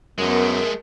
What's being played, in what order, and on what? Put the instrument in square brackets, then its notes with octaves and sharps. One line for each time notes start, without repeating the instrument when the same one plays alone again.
[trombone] F#2 [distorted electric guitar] G#3 A3 [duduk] B3 [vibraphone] A#4